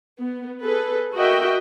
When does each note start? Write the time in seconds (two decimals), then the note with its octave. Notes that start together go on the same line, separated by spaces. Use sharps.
0.20 B3
0.62 G#4 A4 B4
1.14 F#4 A#4 D#5 E5 G5